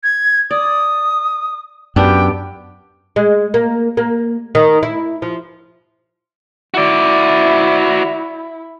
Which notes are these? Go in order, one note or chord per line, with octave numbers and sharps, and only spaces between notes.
G#6
D5 D#6
F#2 B3 D4 G4 G5
G#3
A#3
A#3
D#3
E4
F3
E4 F#4 D5